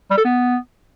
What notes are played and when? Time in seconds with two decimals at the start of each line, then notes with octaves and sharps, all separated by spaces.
0.11 G3
0.18 A4
0.25 B3